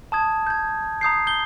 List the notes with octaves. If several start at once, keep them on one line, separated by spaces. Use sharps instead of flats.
A5 D#6 G#6
G6 G#6
A#5 D#6 G6 C7
G6 G7